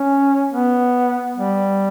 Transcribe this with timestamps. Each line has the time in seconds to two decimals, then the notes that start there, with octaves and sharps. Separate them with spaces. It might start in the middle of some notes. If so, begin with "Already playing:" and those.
Already playing: C#4
0.52 B3
1.37 G3